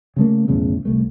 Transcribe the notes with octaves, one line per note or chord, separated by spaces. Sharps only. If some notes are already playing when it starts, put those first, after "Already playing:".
C#3 A3 A#3
B1 E2 A2 C#3
C2 A3